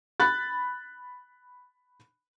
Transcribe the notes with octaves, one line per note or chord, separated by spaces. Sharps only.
B5 F#6 A6